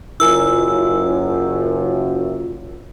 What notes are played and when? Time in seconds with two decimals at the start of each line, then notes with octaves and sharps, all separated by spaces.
0.20 F#1 F#2 E4 F4 A#4 G#5 E6